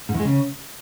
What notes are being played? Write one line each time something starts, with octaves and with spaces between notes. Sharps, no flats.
G#2
E2
G#3
C#3